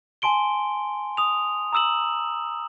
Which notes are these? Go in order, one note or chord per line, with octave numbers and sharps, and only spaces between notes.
G#5 A5 C6 D7 G7
D#6 F7
A#5 D#6 E6 E7 F#7